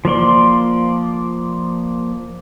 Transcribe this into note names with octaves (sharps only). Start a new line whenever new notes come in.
F3 A#3 D5 C6